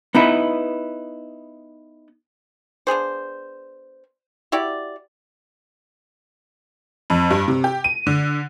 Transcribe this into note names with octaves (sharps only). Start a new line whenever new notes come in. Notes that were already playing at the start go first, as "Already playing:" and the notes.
B3 D#4 E4 B4
B3 D4 G#4 C5
E4 F#4 G4 D5
F2
G2
C3
G4
D#7
D3